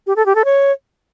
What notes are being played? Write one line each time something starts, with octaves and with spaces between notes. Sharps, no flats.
G4
A4
G4
A4
C#5